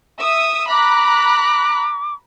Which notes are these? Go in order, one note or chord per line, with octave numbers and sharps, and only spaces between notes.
E5 D#6 E6
A#5 B5 D6 F#6